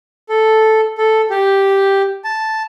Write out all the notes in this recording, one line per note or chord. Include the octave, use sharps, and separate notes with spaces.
A4
A4
G4
A5